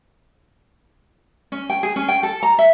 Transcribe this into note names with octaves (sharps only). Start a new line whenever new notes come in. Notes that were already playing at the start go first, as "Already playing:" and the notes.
C#4
G5
G#4
C#4
G5
A4
A#5
E5